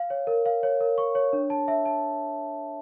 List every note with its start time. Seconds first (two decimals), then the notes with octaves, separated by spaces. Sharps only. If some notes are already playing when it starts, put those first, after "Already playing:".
Already playing: F5
0.10 C#5
0.27 A#4
0.46 F5
0.63 C#5
0.81 A#4
0.98 C#6
1.15 C#5
1.33 D4
1.50 A5
1.68 E5
1.85 A5